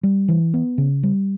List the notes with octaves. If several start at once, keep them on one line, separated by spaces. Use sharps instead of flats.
G3
E3
B3
C#3
G3